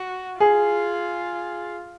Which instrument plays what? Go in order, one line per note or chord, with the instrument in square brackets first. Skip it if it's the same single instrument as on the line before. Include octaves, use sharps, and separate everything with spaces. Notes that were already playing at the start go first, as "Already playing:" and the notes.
Already playing: [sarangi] F#4
[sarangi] F4 [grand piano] G#4